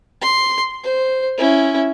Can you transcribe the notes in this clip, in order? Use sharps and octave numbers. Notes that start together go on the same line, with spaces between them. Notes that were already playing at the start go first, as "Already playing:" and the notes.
C6
C5
C#4 E4